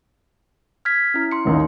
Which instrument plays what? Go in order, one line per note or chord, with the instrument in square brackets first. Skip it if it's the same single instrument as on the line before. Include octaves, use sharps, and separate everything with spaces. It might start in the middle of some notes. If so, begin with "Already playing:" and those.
[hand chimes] F6 G#6 B6
C#4 E4
C6 C#7
[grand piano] A1 D#2 D#4